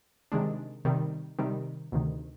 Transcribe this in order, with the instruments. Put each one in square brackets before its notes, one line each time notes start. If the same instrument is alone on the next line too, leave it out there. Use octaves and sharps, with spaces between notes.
[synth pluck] C3 D#3 G#3 D4
C3 D#3 G3
C3 D#3 G3
D2 C3 D#3